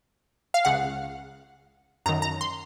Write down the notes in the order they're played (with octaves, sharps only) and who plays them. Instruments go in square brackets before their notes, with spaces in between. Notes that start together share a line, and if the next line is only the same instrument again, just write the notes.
[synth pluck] F5
C#2 C#3 F#5
F#2 A#5
D#3
A#5
C6